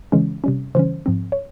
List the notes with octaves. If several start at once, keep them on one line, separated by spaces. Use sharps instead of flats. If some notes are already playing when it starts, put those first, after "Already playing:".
C#3 E3 G#3 C#4
C3 G3 C#4
C#3 E3 G3 C#4 C5
G#2 F3 C4
C#5